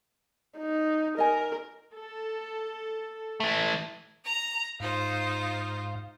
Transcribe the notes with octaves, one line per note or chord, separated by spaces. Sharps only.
D#4
A#4 D#5 G#5
A4
E3 A3
A#5
G#2 D#4 F4 C5 F5